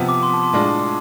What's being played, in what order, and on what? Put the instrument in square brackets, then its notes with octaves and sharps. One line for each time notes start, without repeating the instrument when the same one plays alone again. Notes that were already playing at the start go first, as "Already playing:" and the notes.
Already playing: [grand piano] C3 F3 B3
[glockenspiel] D6
C6
A5
C6
[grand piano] A2 G#3 D4 F4